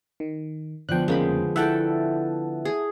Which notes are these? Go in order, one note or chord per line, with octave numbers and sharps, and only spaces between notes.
D#3
D3 F3 B3 G5 F#6
F2 C#3 G#3 A#3 G5 B5
E4 A4 E5 F#5 G5 A5
G#4